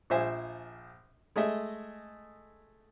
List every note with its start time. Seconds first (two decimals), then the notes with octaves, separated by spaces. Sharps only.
0.10 A#1 F3 C5 E5 G#5
1.36 G#3 A3 D#5 E5